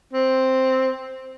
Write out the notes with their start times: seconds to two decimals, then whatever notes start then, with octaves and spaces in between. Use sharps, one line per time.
0.13 C4